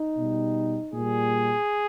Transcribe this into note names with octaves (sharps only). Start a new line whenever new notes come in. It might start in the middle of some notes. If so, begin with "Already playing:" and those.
Already playing: D#4
B2 G3
A#2 G3 G#4